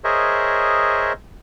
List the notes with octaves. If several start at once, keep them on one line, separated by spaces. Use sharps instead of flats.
G#4 A#4 C5 C#5 D#5 E5